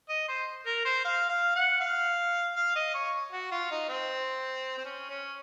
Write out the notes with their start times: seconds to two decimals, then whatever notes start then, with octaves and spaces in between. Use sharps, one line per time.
0.09 D#5
0.28 C5
0.66 A#4
0.85 C5
1.05 F5
1.29 F5
1.56 F#5
1.81 F5
2.57 F5
2.76 D#5
2.94 C#5
3.32 F#4
3.51 F4
3.71 D#4
3.89 C4
4.77 C4
4.85 C#4
5.10 C#4